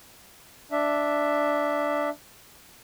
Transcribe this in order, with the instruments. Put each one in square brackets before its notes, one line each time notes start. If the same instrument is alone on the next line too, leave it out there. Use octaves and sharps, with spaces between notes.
[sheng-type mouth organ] D4 E5